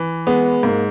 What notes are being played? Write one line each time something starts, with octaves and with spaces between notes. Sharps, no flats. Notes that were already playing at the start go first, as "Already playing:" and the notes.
Already playing: E3
G#3 B3
G#2 A#3